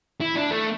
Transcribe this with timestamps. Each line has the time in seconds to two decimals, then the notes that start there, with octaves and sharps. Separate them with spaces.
0.21 E4
0.36 D4
0.51 A3